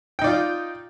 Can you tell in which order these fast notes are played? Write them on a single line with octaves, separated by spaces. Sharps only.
G5 D#4 D5 F4